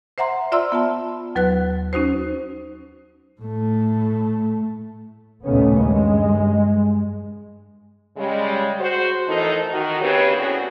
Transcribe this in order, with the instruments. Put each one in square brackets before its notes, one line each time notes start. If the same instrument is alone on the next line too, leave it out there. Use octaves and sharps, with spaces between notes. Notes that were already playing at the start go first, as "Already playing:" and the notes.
[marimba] C5 E5 F#5 A#5 C6
F4 D5 E5 A#5 C6 E6
B3 F4 A5
D#2 F#3 B4 F#5 F#6
C#4 D#4 F#4 C5
[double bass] A2 A3
[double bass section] D#2 A#2 C#3 A3 B3 C#4
G2 G#3
[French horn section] C#3 G3 G#3
F#4 C5
F2 A2 E3 D#4 A4 A#4
D#3 F#4
D#2 C#3 C4 G4 B4 C#5
A2 B3 C#4 F#4 G#4 D5